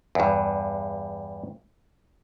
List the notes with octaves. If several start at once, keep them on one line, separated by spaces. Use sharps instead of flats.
E2 G2